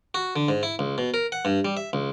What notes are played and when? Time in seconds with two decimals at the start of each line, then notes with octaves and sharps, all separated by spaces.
0.14 F#4
0.36 D3
0.49 G#2
0.63 E4
0.79 C#2
0.98 B2
1.14 A#4
1.32 F#5
1.45 G2
1.65 G3
1.77 E5
1.93 C#2